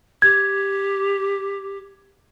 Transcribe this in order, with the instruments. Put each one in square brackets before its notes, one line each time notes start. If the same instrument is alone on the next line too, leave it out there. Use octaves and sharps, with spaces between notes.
[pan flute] G4 [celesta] G#6